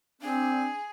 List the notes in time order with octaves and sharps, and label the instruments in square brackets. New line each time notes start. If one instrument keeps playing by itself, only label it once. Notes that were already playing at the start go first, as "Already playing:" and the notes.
[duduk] C4 [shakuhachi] D4 [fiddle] G#4